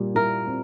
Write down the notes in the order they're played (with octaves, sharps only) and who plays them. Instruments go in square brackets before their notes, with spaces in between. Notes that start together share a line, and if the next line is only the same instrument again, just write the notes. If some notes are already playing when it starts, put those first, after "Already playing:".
Already playing: [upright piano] A#2 G3
[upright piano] E4 [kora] A#4
[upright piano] C4